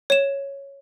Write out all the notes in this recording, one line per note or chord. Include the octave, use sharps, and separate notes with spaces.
C#5 E7